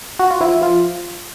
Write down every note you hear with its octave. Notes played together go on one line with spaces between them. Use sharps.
F#4
F4
F3 E4
F3 F4